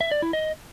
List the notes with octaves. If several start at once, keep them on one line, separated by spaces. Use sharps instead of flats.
E5
D5
E4
D#5